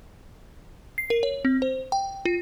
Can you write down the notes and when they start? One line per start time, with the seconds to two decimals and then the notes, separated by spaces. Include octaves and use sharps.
0.98 C7
1.10 A#4
1.23 C#5
1.45 C4
1.62 C5
1.92 G5
2.25 F4